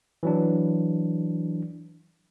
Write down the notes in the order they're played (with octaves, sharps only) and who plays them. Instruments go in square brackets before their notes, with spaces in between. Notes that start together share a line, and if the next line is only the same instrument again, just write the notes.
[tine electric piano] E3 F#3 D4